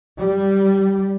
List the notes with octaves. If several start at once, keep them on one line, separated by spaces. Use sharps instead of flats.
G3